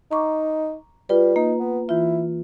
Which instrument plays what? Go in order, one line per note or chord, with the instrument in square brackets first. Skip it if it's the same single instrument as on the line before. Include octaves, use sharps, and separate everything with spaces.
[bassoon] D#4 [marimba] A#5 C#6 D6
[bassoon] G3 [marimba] F4 B4
[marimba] A#3 [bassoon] D#4
[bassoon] B3
[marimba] E3 F4 [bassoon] E4